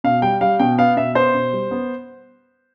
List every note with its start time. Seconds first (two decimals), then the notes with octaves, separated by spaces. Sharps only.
0.04 B2 F5
0.22 G3 G5
0.41 G3 F5
0.59 B2 G5
0.78 B3 F5
0.96 B2 E5
1.15 B3 C5
1.34 B2
1.53 G3
1.71 B3